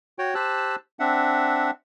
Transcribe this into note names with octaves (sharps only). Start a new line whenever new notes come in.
F#4 C#5 G5
G4 C5 A5 E6 F#6
C4 D4 E5 F#5